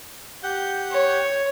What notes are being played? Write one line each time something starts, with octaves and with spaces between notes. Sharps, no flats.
G4 F#5 G6
C#5